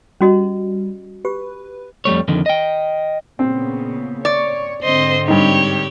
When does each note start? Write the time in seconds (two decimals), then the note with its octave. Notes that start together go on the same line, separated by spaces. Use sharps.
0.21 G3 C#4 F#4 D#5
1.25 G4 B4
2.05 F2 G3 A3 C#5
2.28 F2 D3 D#3
2.46 D#5 G5
3.39 A#2 C#3 B3 C4
4.25 C#5 D5
4.83 G#2 D3 C4 C5 D#5
5.28 G2 D#4 G4 C#5